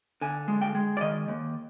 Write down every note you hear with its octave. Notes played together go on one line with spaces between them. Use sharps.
D3 G#5
G#3
G5
G#3
D5
D#3 D#5
D#2